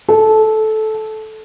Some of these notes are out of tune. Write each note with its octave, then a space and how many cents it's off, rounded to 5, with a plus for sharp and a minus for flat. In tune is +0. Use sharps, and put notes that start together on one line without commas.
A4 -15